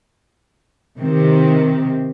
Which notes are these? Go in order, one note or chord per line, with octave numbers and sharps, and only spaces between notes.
C3 D#3